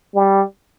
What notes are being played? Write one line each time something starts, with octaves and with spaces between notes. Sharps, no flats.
G3